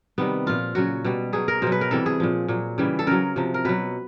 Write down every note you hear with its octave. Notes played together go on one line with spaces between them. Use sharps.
C3 D#3 G3 B3
A#2 F3 F4
C#3 F#3 F#4
B2 G3
B2 F#3 G#4
A#4
B2 F#3 C5
B4
A#4
C3 E3 G3 A4
G#4
A#2 F3
A#2 F#3
C#3 E3 G3
A4
C#3 F#3 A#4
C3 F3
A#4
B2 F#3 B4